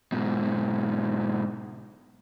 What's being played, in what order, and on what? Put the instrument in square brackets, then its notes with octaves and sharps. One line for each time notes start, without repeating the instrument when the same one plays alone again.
[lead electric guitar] G#2 B2